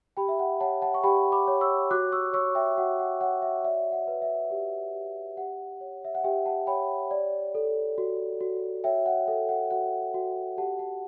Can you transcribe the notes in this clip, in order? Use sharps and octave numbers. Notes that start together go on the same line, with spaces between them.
G4 G5 B5
E5
F#5
C#5 F#5 A5
F#5 A5
C#6
G4 G5 B5
B5 D6
C#5
C#6 E6
F#4 D6 F#6
C#6 E6
C#5 C#6 E6
E5 G5
F#4 F#5
F#5
C#5 F#5
E5
D5 E5
F#5
B4
E5
G4
G4
G4 F#5
C#5
E5
F#5
G4 E5 G5
F#5 A5
C#5 G5 B5
D5
A4
F#4
F#4
C#5 E5 G5
F#5
A4 E5
F#5
F#4 F#5
F#4
G4 F#5 A5
F#5 A5